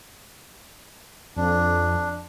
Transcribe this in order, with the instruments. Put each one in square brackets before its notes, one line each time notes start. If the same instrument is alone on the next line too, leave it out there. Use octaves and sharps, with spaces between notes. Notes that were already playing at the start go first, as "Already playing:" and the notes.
[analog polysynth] F2 [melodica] D4